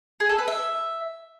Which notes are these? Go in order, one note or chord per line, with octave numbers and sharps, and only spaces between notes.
G#4
A4
B4
E5